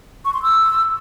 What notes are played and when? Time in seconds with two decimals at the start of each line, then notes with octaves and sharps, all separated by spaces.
0.25 C#6
0.34 C6
0.43 E6